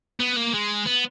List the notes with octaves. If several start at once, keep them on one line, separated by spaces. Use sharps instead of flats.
B3
A#3
G#3
B3